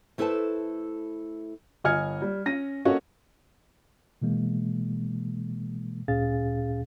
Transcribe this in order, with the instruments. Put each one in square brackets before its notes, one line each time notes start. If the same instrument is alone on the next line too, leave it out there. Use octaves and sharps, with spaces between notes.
[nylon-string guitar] A3 E4 A4 B4 C5 A5
[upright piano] G1 D#5 G#5 F6 G#6 C#7
G3
C#4 A#6 D#7
A#3 C#4 F#4 A4 C#5 D#5
[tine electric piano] B2 E3 G#3 A#3
D2 A#2 C#4 G#4 F5 A6